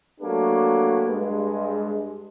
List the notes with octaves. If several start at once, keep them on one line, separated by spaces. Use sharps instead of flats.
F#3 A3 A#3 D4 G4 B4
G2 G#3